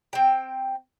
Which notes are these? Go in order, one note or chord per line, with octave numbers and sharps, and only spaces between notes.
C4 G5